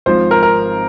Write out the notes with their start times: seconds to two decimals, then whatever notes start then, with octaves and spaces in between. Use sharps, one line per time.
0.06 G#1 G#2 F3 C5
0.31 A#4
0.43 A#4